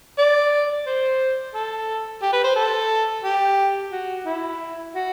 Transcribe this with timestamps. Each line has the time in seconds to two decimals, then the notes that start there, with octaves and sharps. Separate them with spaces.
0.18 D5
0.86 C5
1.54 A4
2.22 G4
2.32 B4
2.44 C5
2.56 A4
3.24 G4
3.91 F#4
4.26 E4
4.95 F#4